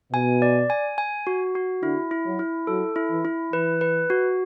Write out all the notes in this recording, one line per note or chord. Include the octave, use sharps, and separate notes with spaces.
B2 G#5
D5
G#5
G#5
F#4
F#4
D3 E4
E4
F#3
E4
F#3 A4
E4
E3
E4
E3 B4
B4
F#4